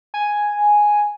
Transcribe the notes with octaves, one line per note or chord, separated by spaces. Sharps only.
G#5